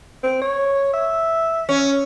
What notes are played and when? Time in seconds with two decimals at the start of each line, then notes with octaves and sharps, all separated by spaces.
0.23 C4
0.42 C#5
0.94 E5
1.69 C#4